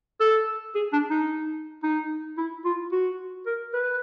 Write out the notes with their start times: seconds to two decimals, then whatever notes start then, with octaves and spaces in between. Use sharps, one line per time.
0.20 A4
0.75 G#4
0.93 D4
1.10 D#4
1.83 D#4
2.38 E4
2.65 F4
2.92 F#4
3.47 A#4
3.74 B4